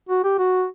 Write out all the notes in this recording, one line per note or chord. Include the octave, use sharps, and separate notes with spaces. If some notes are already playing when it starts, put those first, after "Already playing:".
F#4
G4
F#4